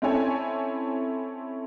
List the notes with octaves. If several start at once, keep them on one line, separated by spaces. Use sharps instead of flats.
C4 C#4 E4 A4 C#5 G#5